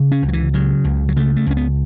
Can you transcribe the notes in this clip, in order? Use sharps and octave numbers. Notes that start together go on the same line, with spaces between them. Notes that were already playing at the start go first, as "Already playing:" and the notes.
Already playing: C#3
C#4
C#2
F#3
E3
C#3 F#3
C#2
F#3
C#3 A3
A3
C#2 C#4
B3